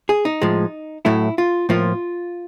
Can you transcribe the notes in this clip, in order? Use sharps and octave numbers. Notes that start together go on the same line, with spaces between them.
G#4
D#4
A2 F3 G#3
A2 F#3 A3 E4
F4
A2 F3 A#3 F4